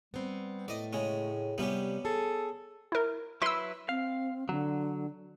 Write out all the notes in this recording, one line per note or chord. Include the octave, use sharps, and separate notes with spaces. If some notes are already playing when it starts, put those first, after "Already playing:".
G3 B3 C4
A2 A3 D5 D#5
C#3 G#3 C#4
C3 G3 B3 C#4 G4
G#4 A4
E4 A#4
F#3 E4 B4 C6 E6
C4 F5
D3 F#3